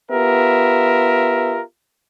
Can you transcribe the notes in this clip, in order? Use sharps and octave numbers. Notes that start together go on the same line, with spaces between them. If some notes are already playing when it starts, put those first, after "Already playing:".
B3 F4 G4 A#4 E5